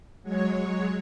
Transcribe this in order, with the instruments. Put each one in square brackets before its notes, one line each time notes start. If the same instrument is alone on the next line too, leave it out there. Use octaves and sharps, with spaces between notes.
[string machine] F#3 G#3 C#5